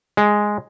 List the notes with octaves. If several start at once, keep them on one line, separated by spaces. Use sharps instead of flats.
G#3